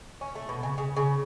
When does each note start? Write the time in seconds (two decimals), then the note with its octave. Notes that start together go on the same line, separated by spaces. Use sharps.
0.21 C#4
0.35 A3
0.49 B2
0.63 C#3
0.78 C#3
0.96 C#3